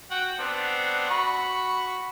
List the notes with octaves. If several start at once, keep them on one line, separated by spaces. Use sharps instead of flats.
F#4 F#5 G5
B3 C4 D4
F#4 B5 C#6